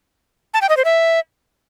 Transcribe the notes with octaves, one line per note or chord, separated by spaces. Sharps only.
A5
G5
D#5
C5
E5